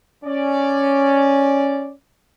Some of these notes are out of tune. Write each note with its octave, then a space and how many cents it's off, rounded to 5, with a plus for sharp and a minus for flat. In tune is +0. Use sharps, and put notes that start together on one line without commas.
C#4 +0 D5 +0